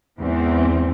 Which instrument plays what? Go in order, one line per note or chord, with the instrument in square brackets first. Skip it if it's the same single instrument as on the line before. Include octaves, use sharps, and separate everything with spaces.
[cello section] E2 G#2 E3 C4